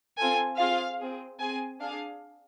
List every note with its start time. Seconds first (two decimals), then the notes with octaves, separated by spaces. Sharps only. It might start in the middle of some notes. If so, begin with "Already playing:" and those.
0.19 C4 F4 A4 G#5
0.59 C4 F4 G#4 F5
1.00 C4 G#4
1.40 C4 G#4 G#5
1.81 D4 G#4 F5